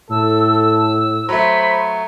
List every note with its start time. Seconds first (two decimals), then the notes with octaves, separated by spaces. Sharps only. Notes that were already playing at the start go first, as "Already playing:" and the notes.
0.10 A2 A4 E6
1.29 F#3 A3 C5 B5